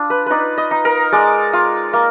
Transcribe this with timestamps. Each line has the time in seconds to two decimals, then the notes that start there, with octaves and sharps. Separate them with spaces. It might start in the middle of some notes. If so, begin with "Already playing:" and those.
Already playing: D4 F4
0.10 B4
0.26 D#4 B4 D5
0.58 D#5
0.71 D#4
0.85 A#4
1.13 G#3 D5
1.53 F4
1.93 A#3